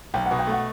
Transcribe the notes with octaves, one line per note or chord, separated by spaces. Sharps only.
B1 G5
F#5
B2
G5
A3
F#5